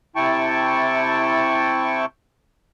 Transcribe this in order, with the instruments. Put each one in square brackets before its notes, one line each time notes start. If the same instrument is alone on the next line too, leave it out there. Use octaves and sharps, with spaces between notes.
[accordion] C3 E4 G5 A5 C#6